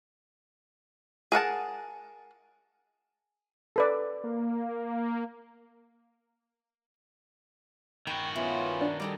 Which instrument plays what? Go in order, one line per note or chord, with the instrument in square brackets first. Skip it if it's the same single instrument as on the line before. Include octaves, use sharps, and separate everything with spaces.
[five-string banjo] G#4 A#4 F#5 A5
[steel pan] A4 B4 D5
[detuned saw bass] A#3
[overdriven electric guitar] D#3 F#4 [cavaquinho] G5 B5 C#6
[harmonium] B3 C#4 F4 [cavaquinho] E4
[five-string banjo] D4
[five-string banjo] G3 A4 [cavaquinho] G4 D5 D#6